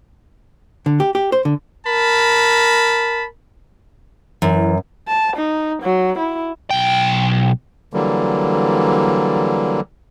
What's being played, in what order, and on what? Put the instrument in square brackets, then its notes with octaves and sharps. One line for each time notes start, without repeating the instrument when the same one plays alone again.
[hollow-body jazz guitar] D3
G4
G4
C5
D3
[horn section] A#4 A5 B5
[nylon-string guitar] F#2 [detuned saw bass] E3
[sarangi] A5
D#4
F#3
E4
[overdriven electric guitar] B1 G5
[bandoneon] D3 E3 F#3 G3 A#3